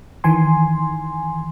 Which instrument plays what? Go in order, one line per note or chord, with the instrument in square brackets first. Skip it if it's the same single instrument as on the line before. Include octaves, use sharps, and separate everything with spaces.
[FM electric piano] D#3 E3 G#5 C6